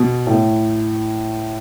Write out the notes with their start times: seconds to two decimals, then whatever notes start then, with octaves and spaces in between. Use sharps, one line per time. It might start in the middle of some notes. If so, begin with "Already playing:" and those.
Already playing: B2
0.27 A2